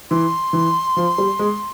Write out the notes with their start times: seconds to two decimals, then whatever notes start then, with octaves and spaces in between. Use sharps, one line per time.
0.10 E3 C6
0.53 E3
0.97 F3
1.18 G3
1.39 G#3